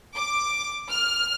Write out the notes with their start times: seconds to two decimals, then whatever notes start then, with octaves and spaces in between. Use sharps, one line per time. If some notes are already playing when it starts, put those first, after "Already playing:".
0.15 D6
0.89 F6